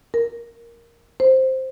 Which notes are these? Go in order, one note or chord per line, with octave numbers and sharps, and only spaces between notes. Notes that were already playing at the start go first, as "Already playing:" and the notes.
A#4
C5